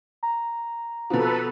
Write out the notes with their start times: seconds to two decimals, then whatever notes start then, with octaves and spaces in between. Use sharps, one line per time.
0.23 A#5
1.10 B2 F3 A4 B4